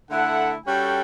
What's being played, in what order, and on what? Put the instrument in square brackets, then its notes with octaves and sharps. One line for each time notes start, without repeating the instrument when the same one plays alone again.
[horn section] D3 A3 E4 A4 E5 [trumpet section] F#5
[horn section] G3 C#4 F#4 A4 [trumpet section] G5